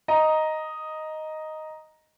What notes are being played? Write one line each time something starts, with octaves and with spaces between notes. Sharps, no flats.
D#5 A#5